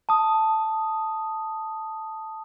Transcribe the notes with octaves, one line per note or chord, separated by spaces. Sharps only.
A5 D#6